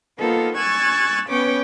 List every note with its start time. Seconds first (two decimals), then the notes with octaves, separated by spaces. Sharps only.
0.18 F3 A#3 B3 D#4 F4 A4
0.56 G#5 C#6 E6 F#6 G#6 A6
1.28 B3 C#4 B4 C#5 G5 D6